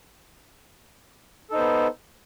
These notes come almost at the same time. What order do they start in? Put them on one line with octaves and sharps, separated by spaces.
A4 D#4 C5 B3